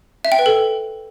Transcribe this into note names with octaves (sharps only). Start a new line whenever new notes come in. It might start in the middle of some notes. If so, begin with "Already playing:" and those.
E5
G5
B4
A4